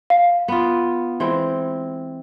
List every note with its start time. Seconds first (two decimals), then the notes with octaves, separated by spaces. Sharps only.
0.10 F5
0.48 B3 F4
1.20 E3 G#3 C4